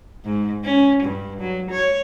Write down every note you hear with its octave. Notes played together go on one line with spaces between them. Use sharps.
G#2
C#4
G2
F#3
C#5